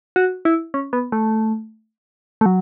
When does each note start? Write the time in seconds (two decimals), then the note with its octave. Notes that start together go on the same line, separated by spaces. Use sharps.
0.16 F#4
0.45 E4
0.74 C#4
0.93 B3
1.12 A3
2.41 A3
2.46 F#3